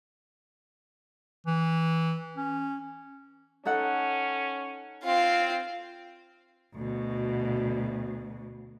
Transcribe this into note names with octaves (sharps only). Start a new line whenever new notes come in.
E3
C#4
C#4 D#4 A4 F#5
C4 F4 F5
D2 B2